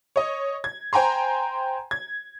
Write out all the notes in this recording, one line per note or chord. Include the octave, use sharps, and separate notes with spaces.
C#5 D#5
G#6
C5 G5 G#5 A#5 C6
G#6